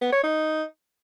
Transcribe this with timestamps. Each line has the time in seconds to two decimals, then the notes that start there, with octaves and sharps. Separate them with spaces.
0.01 B3
0.13 C#5
0.24 D#4